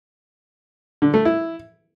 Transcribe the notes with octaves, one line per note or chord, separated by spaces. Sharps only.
D3
A3
E4